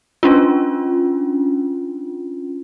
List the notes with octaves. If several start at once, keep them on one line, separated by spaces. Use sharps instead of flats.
C#4 D4 F4